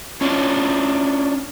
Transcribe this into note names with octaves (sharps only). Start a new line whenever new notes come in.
C#4 D4 F4 C#5